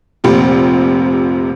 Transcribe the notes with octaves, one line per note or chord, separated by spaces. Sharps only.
F1 A#1 C3